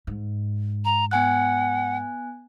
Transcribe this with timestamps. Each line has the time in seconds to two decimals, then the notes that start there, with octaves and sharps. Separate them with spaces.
0.07 G#2
0.85 A#5
1.11 B3 F#5 G#5 F#6